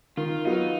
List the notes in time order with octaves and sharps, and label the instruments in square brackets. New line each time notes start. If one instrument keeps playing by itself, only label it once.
[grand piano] D#3 [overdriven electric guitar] F4
[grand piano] F#3 B3 F4 [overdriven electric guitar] D#4